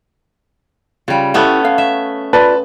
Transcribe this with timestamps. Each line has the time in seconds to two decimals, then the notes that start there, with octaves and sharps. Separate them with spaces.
1.08 C#3 G3 F4
1.34 A3 B3 C#4 E4 G4
1.65 F5
1.78 E5
2.33 F4 B4 D5 A5 B5